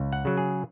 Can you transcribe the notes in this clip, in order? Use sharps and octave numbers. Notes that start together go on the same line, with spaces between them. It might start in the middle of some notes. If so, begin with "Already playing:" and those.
Already playing: C#2
F#5
C#3 F#3
G#4